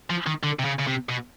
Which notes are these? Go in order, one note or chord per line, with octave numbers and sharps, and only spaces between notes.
F3
D#3
D3
C3
C#3
C#3
C3
B2